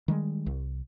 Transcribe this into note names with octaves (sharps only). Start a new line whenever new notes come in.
D#3 G3 G#3
C2